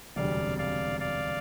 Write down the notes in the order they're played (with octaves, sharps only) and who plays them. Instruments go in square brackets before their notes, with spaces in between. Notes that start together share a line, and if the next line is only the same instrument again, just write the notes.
[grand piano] E1 D2 C3 G3 [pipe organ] D5 F5
[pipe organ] D5 F5
D5 F5